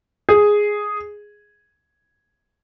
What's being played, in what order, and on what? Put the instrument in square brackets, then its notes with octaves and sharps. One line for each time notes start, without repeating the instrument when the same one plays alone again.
[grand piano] G#4